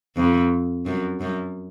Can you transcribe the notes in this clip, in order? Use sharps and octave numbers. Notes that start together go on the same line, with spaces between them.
F2
F#2
F#2